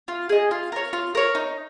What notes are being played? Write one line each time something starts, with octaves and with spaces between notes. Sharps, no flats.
F4
G#4 D#5
F4
A#4 C#5
F4
A#4 C#5
D#4